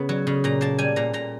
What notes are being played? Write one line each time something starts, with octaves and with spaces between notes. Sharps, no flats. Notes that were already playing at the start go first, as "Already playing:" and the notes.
Already playing: C#3 B3
F#3
C#3
A#2 A#5
A#3 A5
G3 G#5
A#2 A#5
A#2 A#5